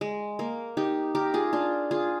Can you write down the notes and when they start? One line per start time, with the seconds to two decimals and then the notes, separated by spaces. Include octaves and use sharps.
0.01 G#3
0.39 A#3
0.77 D#4 G4
1.15 G4 A#4
1.34 F4 G#4
1.53 D4 F4
1.91 F4 G#4